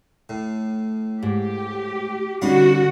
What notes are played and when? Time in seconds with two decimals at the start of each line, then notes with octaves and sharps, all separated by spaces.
0.29 A2
1.23 G#2 G4
2.42 D3 G3 C#4 D#4 F#4 F5 F#5